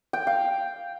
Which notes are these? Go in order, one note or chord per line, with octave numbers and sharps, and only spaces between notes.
G5
F5